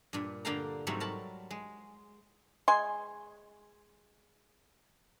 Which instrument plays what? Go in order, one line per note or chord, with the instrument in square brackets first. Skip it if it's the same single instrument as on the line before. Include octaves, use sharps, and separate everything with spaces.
[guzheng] G2 A#2
G2 D3 A#3 F5 G5 A#5
G#2 C3 F#3 G3 A3
A#4 A5 B5
G#3
[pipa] G#3 G#5 C6